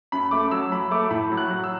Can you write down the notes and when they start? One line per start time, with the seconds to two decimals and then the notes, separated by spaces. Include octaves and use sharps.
0.12 F#2 B5
0.31 A3 D6
0.51 F#3 E6
0.72 F#3 B5
0.91 A3 D6
1.10 A2 B5
1.31 F#3
1.37 F#6
1.50 F#3
1.64 E6